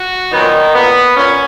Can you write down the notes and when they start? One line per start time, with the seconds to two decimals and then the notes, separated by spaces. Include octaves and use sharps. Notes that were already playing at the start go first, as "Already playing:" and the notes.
Already playing: F#4
0.32 A#2 D#3 F#3 B3 D#4
0.74 A#2 A#3 B3
1.17 A#2 C#4